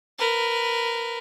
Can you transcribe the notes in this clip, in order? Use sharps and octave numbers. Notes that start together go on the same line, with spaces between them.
A#4 B4